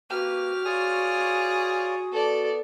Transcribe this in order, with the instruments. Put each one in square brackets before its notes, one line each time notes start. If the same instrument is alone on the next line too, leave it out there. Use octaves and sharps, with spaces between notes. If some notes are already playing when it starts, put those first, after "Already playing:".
[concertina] A#3 B4 [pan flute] F#4 [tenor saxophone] G4 [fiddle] F6
[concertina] F4 C#5 D5 [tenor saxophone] G#4
[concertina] B3 [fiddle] A4 D5